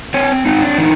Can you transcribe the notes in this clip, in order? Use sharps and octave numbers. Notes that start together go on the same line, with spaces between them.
C4 C#5
C4 D#4
D4
E3 D#4